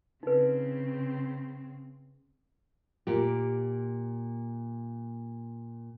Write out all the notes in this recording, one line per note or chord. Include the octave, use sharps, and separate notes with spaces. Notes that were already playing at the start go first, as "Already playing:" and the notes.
C#3 C4 D#4 B4
A#2 G4